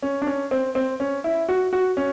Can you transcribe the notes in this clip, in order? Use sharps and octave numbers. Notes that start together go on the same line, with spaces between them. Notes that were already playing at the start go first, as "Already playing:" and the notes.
C#4
D4
C#4
C4
C4
C#4
E4
F#4
F#4
C#4